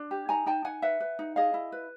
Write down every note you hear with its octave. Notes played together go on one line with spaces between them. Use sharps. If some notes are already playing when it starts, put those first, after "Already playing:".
Already playing: D4
G4
D#4 G#5 A#5
D#4 G5 A5
D#4 F#5 G#5
B4 E5 F#5
B4
D#4
G#4 D#5 F5
E4
B4